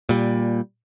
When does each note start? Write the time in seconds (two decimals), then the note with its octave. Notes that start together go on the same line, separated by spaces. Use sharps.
0.09 A#2 G3